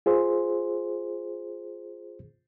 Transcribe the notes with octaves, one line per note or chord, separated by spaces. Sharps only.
F4 G#4 C5